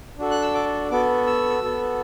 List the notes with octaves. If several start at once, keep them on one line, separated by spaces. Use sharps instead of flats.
D4 F#4 A4
F#6
E6
D6
B3 F#4 A4 D6
E6
B3 F#4 A4